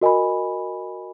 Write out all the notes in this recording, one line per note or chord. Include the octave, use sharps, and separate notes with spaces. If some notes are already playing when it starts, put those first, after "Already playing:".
F#4 A#4 D#5 G#5 B5